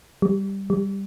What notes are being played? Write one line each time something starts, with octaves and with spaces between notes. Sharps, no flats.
G3
G3